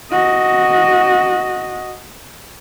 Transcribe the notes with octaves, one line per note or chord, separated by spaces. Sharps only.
F#4 D#5